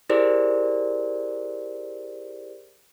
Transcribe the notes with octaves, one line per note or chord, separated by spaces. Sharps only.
E4 G4 G#4 A#4 C5 D5